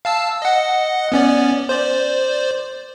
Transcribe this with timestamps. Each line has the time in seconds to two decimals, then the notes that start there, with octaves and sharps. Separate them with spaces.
0.05 F5 A5 E6
0.42 D#5 F#5
1.12 B3 C#4 D5
1.69 C5 D5